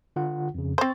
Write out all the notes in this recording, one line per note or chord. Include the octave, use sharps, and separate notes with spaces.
D3 F4 F#5
F2 C#3
C4 C5 C#6 A6